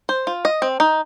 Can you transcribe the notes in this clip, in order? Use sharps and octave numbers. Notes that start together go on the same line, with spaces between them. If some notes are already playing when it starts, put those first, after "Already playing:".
C5
F4
D#5
C4
D#4